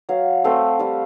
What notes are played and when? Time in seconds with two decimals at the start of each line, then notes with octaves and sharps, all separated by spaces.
0.09 F#3 F5
0.44 A3 C4 F5
0.79 G3 F5